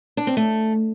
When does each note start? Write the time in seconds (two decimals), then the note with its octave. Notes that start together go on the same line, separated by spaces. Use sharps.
0.17 D4
0.27 C4
0.37 A3